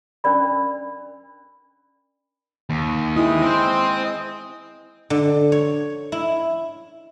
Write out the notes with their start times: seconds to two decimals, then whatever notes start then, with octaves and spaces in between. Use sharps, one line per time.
0.24 C#4 D4 A#4 D5 B5
2.70 D#2
3.16 G#3 E4 D#6
3.42 C4 C5
5.10 D3
5.52 C#5
6.12 E4